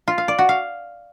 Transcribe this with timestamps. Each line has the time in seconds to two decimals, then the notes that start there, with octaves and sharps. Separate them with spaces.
0.08 F4
0.18 F5
0.28 D5
0.39 F#4
0.49 F5